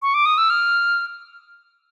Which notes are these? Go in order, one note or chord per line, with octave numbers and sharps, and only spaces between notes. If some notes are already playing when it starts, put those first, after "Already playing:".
C#6
D6
D#6
E6
F6